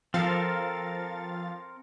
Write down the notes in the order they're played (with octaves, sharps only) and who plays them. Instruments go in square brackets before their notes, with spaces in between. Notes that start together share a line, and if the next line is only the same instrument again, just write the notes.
[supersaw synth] F3 F5 A6 [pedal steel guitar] C4 A4 A#4